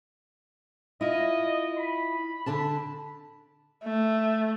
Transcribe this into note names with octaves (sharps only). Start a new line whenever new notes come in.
E4 F4 D#5
B5
D3 D4 A5
A3